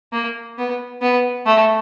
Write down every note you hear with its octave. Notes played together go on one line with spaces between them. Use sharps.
A#3
B3
B3
A3